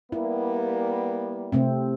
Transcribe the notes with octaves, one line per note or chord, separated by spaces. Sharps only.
G3 A#3 B3 E4
C3 A3 C4